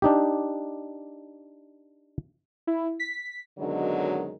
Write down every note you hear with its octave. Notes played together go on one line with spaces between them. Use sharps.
D4 D#4 G4
E4
B6
F#2 B2 D3 D#3 F#3 G#3